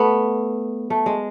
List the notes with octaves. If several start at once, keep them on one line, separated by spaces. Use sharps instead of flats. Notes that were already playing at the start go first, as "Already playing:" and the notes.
Already playing: A3 B3
A3
G#3